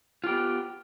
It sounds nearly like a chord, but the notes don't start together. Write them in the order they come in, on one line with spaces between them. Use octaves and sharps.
F4 G4 B3